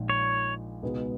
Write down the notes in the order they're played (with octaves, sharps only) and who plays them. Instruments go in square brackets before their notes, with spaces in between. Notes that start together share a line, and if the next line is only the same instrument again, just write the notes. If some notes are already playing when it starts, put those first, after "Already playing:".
Already playing: [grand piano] A#1 A#2 G#3 D#4
[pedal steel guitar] C#5
[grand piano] C#2 B2 G#3 B3 D#4